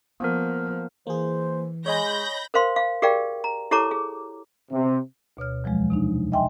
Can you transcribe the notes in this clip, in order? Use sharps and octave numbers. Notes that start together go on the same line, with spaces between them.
F3 A#3 B3 A#4
E3 A#3 G#4 C5
G#3 C#5 D#5 G#5 B5 G6 A#6
A#4 C5 F5 C6
F5
G4 G#4 A#4 D5 F5 G5
A#5
E4 G4 A4 C#5 A#5 D6
G#4
C3
D2 B2 C#5 F6
E2 F3 F#3 G#3
C3 D4 D#4
D#5 E5 G5 G#5 C6